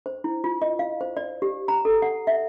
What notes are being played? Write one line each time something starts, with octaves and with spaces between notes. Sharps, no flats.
C5
E4
F4
D#5
F5
C5
D5
G4
A#5
A4
F#5
E5